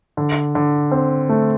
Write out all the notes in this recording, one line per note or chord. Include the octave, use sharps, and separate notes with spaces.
D3
D3
C4
A3